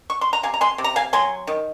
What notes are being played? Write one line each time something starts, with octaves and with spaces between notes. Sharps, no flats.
C#6
C6
A#5
C3 F5 G#5
A#5
G#5 C6
C3
A#5
F5 G#5
F#3 G#5 C6
D#3